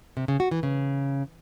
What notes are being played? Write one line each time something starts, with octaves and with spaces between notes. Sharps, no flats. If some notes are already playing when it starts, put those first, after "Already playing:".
C3
C#3
F#4
E3
C#3